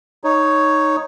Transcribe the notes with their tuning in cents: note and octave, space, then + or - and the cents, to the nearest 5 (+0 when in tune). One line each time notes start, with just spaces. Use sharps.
D#4 +0 C#5 +0